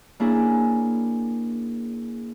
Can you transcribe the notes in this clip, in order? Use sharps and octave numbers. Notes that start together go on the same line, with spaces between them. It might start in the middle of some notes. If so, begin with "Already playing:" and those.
A#3 C#4 D4 E4 G#4